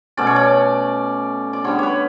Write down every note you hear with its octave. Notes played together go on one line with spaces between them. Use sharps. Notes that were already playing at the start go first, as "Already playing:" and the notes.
B2 A3 C#4 D5
C#5
D5
D5
D3 G3 B3 C#5
B4 C#5